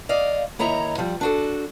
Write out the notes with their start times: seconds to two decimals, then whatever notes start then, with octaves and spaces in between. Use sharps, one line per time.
0.09 D5 D#5 F5
0.59 D#2 E4 C#5 D#5 A#5
0.98 F3 G3
1.21 D4 F#4 A4